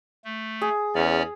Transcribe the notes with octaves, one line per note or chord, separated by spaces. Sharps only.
A3
G#4
E2 C#4 C#5 D5